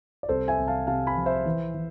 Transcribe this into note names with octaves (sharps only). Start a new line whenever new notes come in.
D5
C2 A4 C5
E5 G#5
C2
F5 A5
C3 F5 A5
G#5 B5
F3
C5 E5
E3
E3